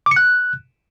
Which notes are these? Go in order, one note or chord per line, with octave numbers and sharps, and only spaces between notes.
D6
C#7
F#6